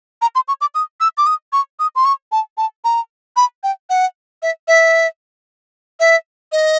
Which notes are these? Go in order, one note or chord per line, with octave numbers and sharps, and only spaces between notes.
A#5
C6
C#6
D6
D#6
E6
D6
D#6
C#6
D#6
C6
C#6
A5
A5
A#5
B5
G5
F#5
E5
E5
E5
D#5